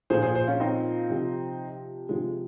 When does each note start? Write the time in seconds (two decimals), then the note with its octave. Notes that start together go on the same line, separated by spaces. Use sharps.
0.10 A#2 F3 G#4 C5
0.22 G#4 C5
0.35 G#4 C5
0.47 C#4 F4
0.60 C4 D#4
1.09 C3 F3
2.09 C3 F3 G#3